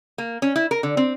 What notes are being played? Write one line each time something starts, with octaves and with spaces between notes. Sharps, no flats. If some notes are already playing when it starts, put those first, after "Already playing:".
A#3
C#4
E4
A#4
D3
C4